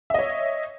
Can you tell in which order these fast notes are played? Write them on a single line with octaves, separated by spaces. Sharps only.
E5 D#5 C#5